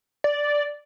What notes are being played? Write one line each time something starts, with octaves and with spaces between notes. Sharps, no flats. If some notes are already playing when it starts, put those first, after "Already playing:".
D5